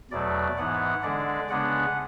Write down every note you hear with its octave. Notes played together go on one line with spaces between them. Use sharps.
E2 B2 F#3 A3 D5
G#2 E3 B3 F#5
D3 G#3 D4 D5
C#3 G#3 B3 D4 F#5